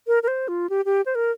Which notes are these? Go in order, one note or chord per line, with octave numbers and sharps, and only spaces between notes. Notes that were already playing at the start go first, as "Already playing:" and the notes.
A#4
A#4
C5
F4
G4
G4
C5
A#4